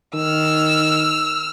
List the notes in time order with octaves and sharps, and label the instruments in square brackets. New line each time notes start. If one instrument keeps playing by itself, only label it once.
[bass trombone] D#3 [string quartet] E6 F6